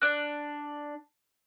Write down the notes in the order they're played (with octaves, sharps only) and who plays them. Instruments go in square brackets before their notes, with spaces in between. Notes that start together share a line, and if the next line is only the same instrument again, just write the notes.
[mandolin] D4 F#6